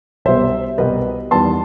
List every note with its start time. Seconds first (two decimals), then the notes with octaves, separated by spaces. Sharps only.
0.25 C2 B2 G3 B3 C5 E5
0.78 C2 B2 G3 B3 B4 D#5
1.31 E2 D#3 G3 B3 A5 C6